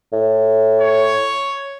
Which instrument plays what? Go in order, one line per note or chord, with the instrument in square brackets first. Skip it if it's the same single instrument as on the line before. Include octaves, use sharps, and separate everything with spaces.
[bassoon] A2
[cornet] C#5